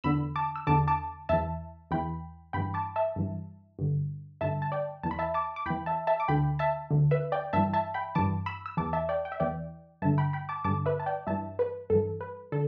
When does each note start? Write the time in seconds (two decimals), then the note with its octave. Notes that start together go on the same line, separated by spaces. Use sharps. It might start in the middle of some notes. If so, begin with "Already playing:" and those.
0.04 E2 D3 B5 E6
0.36 A5 D6
0.56 E6
0.67 E2 D3 A5 D6
0.88 A5 D6
1.29 E2 E3 E5 A5
1.91 E2 E3 G5 B5
2.53 G2 E3 G5 B5
2.74 A5 D6
2.96 E5 A5
3.16 G2 E3
3.79 G2 D3
4.41 G2 D3 E5 A5
4.62 A5
4.72 D5 G5
5.03 E2 E3 A5
5.11 B5
5.19 E5 A5
5.34 A5 D6
5.56 D6
5.66 E2 E3 G5 B5
5.86 E5 A5
6.07 E5 A5
6.20 D6
6.28 D2 D3 G5 B5
6.59 E5 A5
6.91 D2 D3
7.11 B4 E5
7.32 D5 G5
7.53 G2 E3 E5 A5
7.73 E5 A5
7.94 G5 B5
8.15 G2 E3 A5 D6
8.46 B5 E6
8.66 E6
8.77 E2 E3 A5 D6
8.93 E5 A5
9.09 D5 G5
9.25 G5
9.32 E5
9.40 E2 E3 D5 G5
10.02 G2 D3 E5 A5
10.18 G5 B5
10.33 G5 B5
10.49 A5 D6
10.64 G2 D3 A5 D6
10.86 B4 E5
11.00 A5
11.06 D5 G5
11.27 G2 E3 E5 A5
11.59 B4
11.90 G2 E3 A4
12.21 B4
12.52 D3 A4